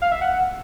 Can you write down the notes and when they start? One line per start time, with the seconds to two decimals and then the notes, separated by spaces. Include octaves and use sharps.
0.02 F5
0.11 E5
0.21 F#5